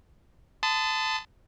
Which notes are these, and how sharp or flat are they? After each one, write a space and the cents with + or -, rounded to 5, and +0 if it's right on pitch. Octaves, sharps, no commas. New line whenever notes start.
A5 +0 C6 -45 D#6 +0